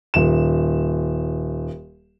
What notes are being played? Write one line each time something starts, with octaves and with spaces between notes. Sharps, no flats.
D#1 E7